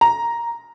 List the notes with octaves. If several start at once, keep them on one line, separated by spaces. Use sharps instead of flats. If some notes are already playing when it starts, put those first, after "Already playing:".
A#5